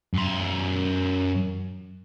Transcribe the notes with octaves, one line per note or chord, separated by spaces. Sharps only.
F#2 C6